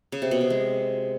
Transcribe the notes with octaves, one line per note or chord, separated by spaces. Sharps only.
C#3
C3
B2
C3
G#3